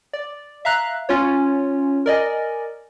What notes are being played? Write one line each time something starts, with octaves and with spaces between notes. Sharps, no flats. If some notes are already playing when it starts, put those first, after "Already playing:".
D5
E5 F5 A#5 F#6
C#4 F4 C#5
A#4 D5 D#5 G#5